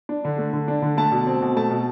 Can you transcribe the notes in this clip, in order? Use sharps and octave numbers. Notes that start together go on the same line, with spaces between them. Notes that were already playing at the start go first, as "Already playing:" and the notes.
D4
D3
A3
D3
D4
D3
A3 A5
B2
C4
B2
A3 A5
B2